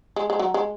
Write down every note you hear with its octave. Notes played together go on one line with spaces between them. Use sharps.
G#3
G#3
F#3
G#3